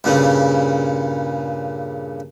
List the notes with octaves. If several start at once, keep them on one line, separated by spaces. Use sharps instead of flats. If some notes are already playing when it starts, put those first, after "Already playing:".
G2 A#2 C#3